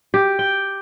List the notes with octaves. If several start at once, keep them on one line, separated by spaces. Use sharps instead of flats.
G4
G5